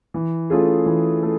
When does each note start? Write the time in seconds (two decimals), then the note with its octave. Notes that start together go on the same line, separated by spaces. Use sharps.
0.14 E3
0.50 A3 C#4 F4 G#4
0.86 E3
1.23 A3